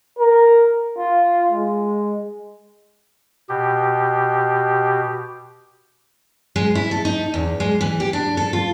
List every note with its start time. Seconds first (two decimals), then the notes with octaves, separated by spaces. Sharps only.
0.19 A#4
0.98 F4
1.51 G#3
3.49 B2 G4
6.56 G#3
6.75 E4
6.91 A4
7.05 D#4
7.34 E2
7.60 G#3
7.81 E3
8.00 G4
8.13 D4
8.37 A4
8.53 F4